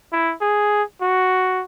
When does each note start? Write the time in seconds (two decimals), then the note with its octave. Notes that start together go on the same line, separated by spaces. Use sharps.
0.13 E4
0.41 G#4
1.01 F#4